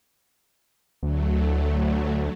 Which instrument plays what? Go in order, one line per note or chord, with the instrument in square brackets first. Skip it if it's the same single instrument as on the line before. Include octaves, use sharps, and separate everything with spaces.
[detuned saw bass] D2 [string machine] F#3 A3